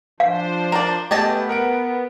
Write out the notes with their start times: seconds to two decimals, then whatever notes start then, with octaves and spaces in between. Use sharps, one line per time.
0.20 F3 D4 C5 F5
0.72 A#4 D5
1.11 A3 B3 G4 G#4 D#5 A5
1.49 A#4 F#5 D7